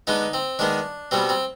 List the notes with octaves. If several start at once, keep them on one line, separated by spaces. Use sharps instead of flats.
D3 G#3 B3 D#4
C4
D#3 G#3 B3 D4
B2 G3 B3 C4
C4